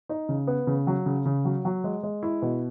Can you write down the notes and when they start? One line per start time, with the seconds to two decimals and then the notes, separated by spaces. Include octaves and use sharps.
0.09 D#4
0.29 C#3
0.47 B3
0.67 C#3
0.87 F#3
1.06 C#3
1.25 C#3
1.45 F#3
1.65 F#3
1.84 G#3
2.03 G#3
2.23 E4
2.42 B2